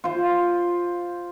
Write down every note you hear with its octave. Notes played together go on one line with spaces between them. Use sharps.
F4 C5